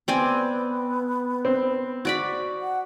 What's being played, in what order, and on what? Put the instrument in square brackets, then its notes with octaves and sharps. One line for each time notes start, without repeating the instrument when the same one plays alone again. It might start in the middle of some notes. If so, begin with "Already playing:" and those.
[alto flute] B3 [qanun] C4 D5 G#5
[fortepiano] C4
[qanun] F#4 D5 B5
[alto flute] F#5